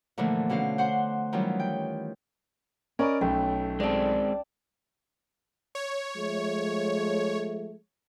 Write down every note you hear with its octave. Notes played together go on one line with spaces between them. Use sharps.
A#2 D3 E3 F3 A3
B2 D3 C#4 F5
C5 F#5 C6
D#3 E3 F#3 G3 C#4 F4
G5
C#4 A#4 D5 D#5 B5
B1 A3 G5
G#3 C4 D5 A5
C#5
F3 G#3 A3